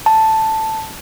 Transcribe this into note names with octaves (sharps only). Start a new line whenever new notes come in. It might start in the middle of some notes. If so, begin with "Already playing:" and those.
A5